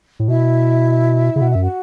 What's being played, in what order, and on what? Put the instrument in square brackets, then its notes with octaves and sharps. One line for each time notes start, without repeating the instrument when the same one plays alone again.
[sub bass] A2
[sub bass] B2 [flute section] E4 E5
[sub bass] C#3
[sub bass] B2 [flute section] F#5
[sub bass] F#2 [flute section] E5
[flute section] F#4 F#5